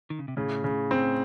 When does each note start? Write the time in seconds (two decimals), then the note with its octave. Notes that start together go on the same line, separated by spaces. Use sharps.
0.10 D#3
0.19 C#3
0.28 C3
0.37 A2 C#3
0.64 C#3
0.91 C4